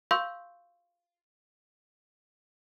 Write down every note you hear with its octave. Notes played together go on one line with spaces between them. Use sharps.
F5 C6 C#6 E6 G6